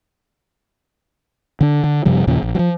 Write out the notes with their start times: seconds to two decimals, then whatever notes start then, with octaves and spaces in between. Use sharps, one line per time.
1.61 D3 D4
1.84 D3
2.05 F#2 C3 F3 G3
2.27 D#2 A#2 C#3 F3
2.42 A#1
2.55 F3 F#3